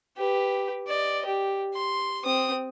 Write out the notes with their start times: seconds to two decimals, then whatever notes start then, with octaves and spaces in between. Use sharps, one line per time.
0.17 G4 B4
0.87 D5 D#5
1.26 G4
1.74 C6
2.25 C4 D#6